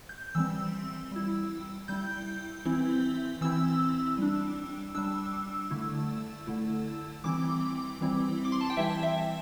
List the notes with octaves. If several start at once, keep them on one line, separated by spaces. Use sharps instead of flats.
G6
E3 G3 C4 E6
G3 E4
G3 E4 G6
E3 C4 E4
E3 C4 E4 E6
G3 D4
G3 D4 E6
D3 A3 E4
D3 A3 E4
E3 G3 C4 E4 D6
E3 G3 C4 E4
D6
C6
A5
G5
E3 G3 E4 E5
E5